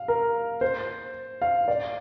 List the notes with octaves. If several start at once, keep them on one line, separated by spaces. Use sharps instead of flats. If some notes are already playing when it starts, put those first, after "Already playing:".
Already playing: F5
A#4
C5
F5
D5